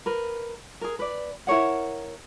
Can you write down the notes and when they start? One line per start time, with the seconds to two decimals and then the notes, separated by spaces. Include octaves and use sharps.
0.06 A#4 B4
0.81 G#4 A#4
0.99 B4 D5
1.47 E4 A#4 C#5 F#5